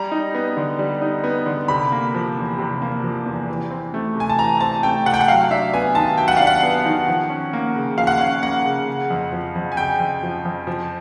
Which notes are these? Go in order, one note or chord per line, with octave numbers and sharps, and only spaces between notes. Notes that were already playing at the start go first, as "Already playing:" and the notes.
Already playing: G3 A#5
D#4
B3
D3
G3
D#4
B3
D3
C3 B5
A#3
F3
E2
C3
A#3
F3
E2
E3
C4
A3
C3 G#5
A5
E3 A#5
C4 A5
A3 G5
C3 F#5
G5
F#5
F#3 F5
D4 E5
B3 G#5
D#3 A5
F#3 G5
F#5
D4 F5
F#5
B3
D#3
F3
C#4
A#3
C#3
F3 F5
F#5
C#4 F5
A#3 F#5
C#3
C#3
F2
F3
F2
G#5
C#3 G5
F2
F3
F2
F3